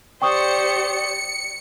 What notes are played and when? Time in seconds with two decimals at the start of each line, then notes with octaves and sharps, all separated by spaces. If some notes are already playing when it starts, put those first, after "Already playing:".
0.22 G4 C5 D5 G5 C#6 D#6 C#7